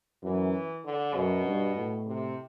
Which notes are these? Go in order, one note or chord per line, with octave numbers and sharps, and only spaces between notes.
F#2 E3
D3
F#2 B2
G2
A2
C3